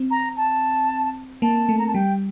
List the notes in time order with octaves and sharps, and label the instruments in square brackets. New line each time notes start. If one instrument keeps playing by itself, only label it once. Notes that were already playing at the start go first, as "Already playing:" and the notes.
Already playing: [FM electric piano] C4
[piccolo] A#5
A5
[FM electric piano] A#3 [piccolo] A5
[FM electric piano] A3
[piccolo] A#5
A5
[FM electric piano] G3 [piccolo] G5